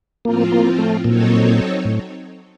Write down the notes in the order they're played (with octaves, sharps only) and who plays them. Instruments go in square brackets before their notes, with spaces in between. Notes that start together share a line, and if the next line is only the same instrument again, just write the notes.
[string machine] A2 F3 C4 F4 [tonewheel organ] A#3
[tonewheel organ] A#3
A3
[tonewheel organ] A#2 [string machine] F#3 C4 D#4 A4 C#5
[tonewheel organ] A2